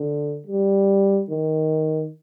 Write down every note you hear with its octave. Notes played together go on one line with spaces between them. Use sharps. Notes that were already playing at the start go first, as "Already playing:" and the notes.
Already playing: D3
G3
D#3